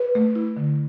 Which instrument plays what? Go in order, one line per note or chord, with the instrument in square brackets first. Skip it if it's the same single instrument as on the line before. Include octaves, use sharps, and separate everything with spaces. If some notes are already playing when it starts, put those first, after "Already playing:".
Already playing: [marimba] B4
A3
E4
D3